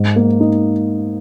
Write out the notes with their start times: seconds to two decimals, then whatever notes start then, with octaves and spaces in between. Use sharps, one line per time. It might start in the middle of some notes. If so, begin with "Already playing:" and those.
Already playing: G#2
0.16 A#3
0.40 D#4